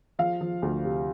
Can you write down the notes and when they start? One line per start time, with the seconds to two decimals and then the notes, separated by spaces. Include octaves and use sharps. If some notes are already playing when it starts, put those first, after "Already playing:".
0.19 F3 F5
0.41 F3
0.62 D2
0.85 C3